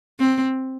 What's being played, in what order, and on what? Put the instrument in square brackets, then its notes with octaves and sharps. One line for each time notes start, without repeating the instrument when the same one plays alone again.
[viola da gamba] C4